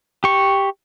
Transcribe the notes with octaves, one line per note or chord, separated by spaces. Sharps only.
G4 C#6